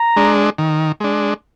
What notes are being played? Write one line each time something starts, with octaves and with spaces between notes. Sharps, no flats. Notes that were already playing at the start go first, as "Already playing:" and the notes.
Already playing: A#5
G#3 D4
D#3
G#3 D4